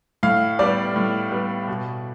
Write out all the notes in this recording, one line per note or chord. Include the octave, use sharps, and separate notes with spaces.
A2 F5
G3 B3 D5
A2
G3 B3
B2